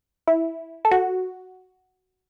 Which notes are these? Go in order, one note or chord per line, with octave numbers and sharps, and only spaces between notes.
E4
A4
F#4